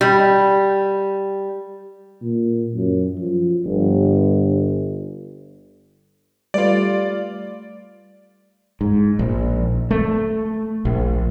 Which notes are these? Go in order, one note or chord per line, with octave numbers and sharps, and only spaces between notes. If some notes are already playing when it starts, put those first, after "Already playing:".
G3
A#2
F#2
F3
G1
G3 A3 F4 B4 D5
G#2
A#1
A3
A#1